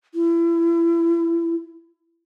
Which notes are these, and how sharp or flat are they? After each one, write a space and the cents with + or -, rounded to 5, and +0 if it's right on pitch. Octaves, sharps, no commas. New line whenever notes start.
E4 +30